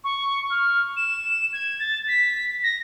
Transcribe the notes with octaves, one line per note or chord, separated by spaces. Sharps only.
C#6
F6
E7
G#6
A6
B6
A#6